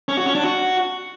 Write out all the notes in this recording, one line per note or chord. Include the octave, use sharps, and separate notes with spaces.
C#4
F#4
C#4
D4
F#4